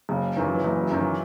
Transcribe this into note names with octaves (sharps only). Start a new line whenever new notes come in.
F#1 C#3
F#2 D#3 E3
F#3
E3
F#1 E3
F#3
F#2 D#3
E3